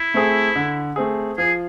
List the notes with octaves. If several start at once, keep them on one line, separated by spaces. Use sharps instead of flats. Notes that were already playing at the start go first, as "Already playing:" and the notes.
Already playing: E4
A3 C4 G#4
D3
A3 C4 G#4
F3 G#4